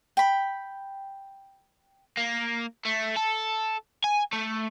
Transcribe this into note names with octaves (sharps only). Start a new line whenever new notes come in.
G5 B5
A#3
A3
A4
G#5
A3